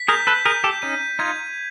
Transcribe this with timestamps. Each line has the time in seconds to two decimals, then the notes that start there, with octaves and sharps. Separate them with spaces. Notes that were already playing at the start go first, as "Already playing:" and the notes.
Already playing: B6
0.08 G#4 A#4 G6
0.27 A4 B4
0.45 G#4 A#4 G6
0.64 G4 A4
0.82 C#4 D#4 D#7
1.19 D#4 F4 G#6